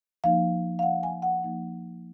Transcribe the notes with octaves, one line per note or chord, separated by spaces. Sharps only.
F3 A#3 D#4 F5
F5
F#5
G#5
F#5
F3 A#3 D#4